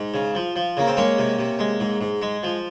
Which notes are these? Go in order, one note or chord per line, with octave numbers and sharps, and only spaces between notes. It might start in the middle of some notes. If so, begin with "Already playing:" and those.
Already playing: G#2
C#3
F3
F3
C#3 A#3
C4
G#3 A#3 C#4
C3
C3
G#3
G#2
G#2
G#3
F3